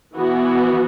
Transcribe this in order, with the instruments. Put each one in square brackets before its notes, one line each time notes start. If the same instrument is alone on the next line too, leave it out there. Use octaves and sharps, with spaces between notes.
[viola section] E3 B3 F#4